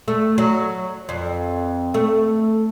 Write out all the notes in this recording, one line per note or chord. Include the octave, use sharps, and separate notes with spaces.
A3
F#3
F2
A3